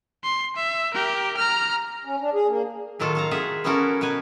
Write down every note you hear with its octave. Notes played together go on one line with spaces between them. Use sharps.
C6
E5
G4 A#4
A#5 F6
C#4
D4
G#4
A#3
A2 D#3 F#3 F4 A4
A4 F5 A#5
F4 G#4 E5 F#5
B3 C#4 E4 F#4 A4 A#4
B2 B3 A#4 B4 G#5